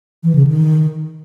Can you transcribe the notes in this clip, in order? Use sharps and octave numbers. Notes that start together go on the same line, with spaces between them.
E3
C#3
D#3